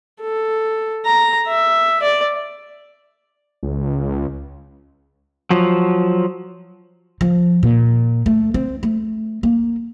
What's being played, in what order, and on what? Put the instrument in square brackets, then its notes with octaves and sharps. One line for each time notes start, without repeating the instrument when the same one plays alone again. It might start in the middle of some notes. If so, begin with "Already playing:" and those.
[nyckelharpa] A4
A#5
E5
D5
[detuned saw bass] C#2
[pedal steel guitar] F3 F#3
[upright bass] F3
A#2
A3
C4
A3
A#3